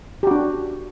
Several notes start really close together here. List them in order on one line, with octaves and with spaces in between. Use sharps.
G4 F#4 D4